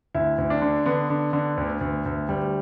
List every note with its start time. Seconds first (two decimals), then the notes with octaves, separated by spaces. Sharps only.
0.15 D2 E4
0.38 D2
0.50 D4
0.62 D3
0.86 D3 B3
1.10 D3
1.33 D3
1.57 D2
1.81 D2
2.06 D2
2.29 D2 G3